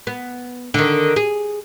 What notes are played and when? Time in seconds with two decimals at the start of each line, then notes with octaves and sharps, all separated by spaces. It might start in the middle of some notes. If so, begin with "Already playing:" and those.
0.07 B3
0.74 D3 D#3
1.16 G#4